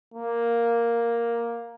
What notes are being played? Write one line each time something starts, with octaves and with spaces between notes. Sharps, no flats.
A#3